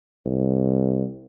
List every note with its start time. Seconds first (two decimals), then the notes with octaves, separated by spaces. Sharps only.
0.26 C2